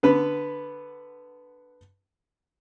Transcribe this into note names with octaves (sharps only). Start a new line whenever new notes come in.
D3 B3 B4